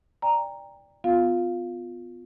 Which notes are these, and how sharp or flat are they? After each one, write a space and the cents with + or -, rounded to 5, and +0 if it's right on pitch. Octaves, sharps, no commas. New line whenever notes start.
D5 +0 G5 +25 A#5 +0
B3 +25 F4 +15 F5 +0